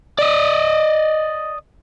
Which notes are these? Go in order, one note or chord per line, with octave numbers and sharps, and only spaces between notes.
D5 D#5